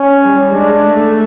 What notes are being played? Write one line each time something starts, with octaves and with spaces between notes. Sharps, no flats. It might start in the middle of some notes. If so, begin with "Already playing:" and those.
Already playing: C#4
G3
G#3 D4
A3